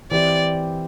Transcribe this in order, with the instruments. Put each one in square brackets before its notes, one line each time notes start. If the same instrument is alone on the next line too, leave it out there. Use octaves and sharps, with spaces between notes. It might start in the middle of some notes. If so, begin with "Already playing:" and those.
[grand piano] E3 C4 G4 [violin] D5